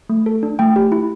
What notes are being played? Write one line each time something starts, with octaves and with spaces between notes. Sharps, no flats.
A3
A4
D4
A3 G5
G4
E4